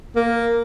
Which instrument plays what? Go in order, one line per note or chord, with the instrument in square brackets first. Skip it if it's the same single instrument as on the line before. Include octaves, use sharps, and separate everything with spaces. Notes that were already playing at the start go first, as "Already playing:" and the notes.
[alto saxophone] A#3